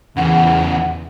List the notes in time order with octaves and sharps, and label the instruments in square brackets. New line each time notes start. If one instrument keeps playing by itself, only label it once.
[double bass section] E2 [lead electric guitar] C#3 E3 [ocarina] F#5